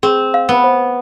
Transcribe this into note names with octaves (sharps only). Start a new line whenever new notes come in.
C4 G#4
F5
B3
C5